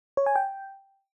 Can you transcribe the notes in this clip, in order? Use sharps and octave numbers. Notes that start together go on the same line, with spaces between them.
C#5
G#5
G5